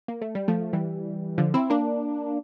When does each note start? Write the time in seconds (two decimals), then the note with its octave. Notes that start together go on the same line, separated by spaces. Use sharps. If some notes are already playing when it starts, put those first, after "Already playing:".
0.08 A#3
0.21 A3
0.35 G3
0.48 F3 A3
0.73 E3 G3
1.38 D3 F3
1.54 C4 E4
1.70 A#3 D4